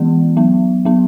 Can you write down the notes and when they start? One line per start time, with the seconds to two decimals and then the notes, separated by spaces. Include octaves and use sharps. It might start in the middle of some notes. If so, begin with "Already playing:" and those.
Already playing: E3 G#3 B3
0.37 F#3 B3
0.85 F#3 B3